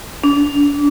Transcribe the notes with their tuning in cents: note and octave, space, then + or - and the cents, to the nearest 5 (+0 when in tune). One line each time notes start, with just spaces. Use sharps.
D4 -30